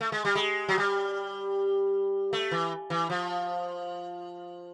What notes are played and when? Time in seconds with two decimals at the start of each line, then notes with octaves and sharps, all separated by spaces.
0.01 A3
0.12 G#3
0.25 G3
0.35 G#3
0.68 F#3
0.78 G3
2.33 A3
2.51 E3
2.90 E3
3.10 F3